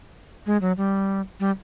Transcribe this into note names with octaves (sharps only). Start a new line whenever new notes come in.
G#3
F#3
G3
G3